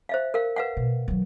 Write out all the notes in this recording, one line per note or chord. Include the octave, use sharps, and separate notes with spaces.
C5 E5 F5
A#4 F5
B4 F5 F#5
B2
D#3 F#3